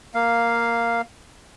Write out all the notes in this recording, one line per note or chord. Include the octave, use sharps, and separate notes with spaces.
A#3 F5